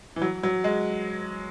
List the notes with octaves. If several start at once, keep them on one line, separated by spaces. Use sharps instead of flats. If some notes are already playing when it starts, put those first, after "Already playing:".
E3
F#3
F#3
G#3